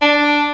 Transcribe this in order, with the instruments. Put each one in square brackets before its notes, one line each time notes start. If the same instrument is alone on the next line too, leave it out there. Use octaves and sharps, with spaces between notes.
[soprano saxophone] D4